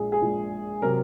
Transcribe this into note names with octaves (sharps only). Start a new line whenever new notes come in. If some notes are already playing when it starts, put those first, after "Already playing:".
Already playing: A#1 A#2 G#3 G#4
G#4
A#1 A#2 G#3
C3 F#3 A#4